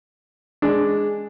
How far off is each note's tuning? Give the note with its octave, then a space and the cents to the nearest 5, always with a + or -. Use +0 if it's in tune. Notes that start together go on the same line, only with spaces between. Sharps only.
G#3 +0 D4 +5